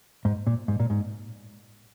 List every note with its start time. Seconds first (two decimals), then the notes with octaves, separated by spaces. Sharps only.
0.25 G#2
0.47 A#2
0.68 G#2
0.80 A#2
0.90 G#2